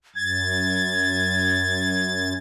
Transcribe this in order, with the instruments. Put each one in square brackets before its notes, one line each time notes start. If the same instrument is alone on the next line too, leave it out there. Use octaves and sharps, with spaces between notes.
[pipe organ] F#2 A6 [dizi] G#6